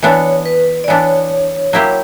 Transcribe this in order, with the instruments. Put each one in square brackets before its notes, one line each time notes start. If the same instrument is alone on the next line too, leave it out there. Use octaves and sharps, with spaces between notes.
[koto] E3 B3 D4 [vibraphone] C#5
[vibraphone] B4
D5
[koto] E3 B3 D4 [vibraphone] C#5
[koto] F#3 A#3 E4 G4